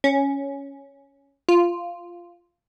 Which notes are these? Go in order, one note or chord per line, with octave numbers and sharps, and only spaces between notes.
C#4
F4